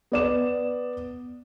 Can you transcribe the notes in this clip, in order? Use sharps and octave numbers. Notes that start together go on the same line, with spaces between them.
B3 D5 E7